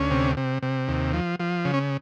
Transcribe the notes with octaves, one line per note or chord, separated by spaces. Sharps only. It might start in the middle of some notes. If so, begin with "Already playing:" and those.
Already playing: D2 C#4
C3
C3
C3
D#2
F3
F3
C#3
C#4